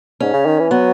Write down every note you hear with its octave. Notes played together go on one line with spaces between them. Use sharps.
G#2 C#4
C#3
D#3
E3
F#3 B3